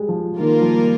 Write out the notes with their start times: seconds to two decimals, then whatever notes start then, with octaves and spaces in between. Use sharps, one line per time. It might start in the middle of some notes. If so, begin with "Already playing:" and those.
Already playing: G3 G#3
0.09 F3
0.39 D#3 G3 A#3 F4 A#4
0.62 F3